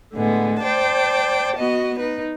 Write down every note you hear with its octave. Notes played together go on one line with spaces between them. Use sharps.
A2 D3 G#3 B3
C5 D5 G5 A5
B3 F#4 D#5
D#4 B4